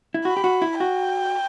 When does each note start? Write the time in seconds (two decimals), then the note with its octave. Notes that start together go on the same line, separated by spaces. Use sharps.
0.14 E4
0.25 F#4 B5
0.37 G4
0.44 F#4
0.62 E4
0.80 F#4 G5